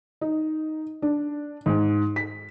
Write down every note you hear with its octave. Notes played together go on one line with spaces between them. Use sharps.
D#4
D4
G#2
B6